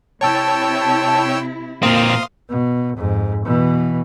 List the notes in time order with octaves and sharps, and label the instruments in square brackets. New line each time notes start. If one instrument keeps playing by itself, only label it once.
[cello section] C3 E4 [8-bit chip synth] C#5 G5 E6 [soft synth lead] A5
[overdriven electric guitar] A#2 C4 [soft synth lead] A#3 [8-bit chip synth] F5 C6 D#6
[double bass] B2
F2 G#2
B2 E3